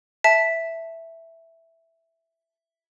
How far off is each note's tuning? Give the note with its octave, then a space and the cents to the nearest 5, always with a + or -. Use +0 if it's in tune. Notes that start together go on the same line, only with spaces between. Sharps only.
E5 +0 A5 -10